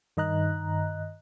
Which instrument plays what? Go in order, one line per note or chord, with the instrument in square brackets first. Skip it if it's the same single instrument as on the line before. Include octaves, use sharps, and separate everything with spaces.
[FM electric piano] G2 D#3 D#5 A#5 F#6